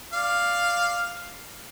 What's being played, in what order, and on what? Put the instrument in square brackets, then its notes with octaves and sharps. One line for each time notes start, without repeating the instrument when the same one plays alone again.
[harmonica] D5 F5